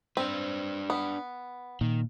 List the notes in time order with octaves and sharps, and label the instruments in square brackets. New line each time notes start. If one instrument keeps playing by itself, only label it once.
[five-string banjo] C4 [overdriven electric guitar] D4 B4
[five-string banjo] B3
[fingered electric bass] A#2 [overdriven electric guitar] D#3